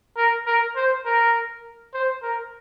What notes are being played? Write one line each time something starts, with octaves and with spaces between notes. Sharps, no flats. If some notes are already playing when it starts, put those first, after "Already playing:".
A#4
A#4
C5
A#4
C5
A#4